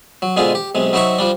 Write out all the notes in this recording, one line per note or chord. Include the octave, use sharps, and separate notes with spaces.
F#3
B2 D3 G#3 C4 F4 G#4
G4
B1 C3 G#3
F#3 C4 D#4 E5 A#5 C#6
F3 G3 D4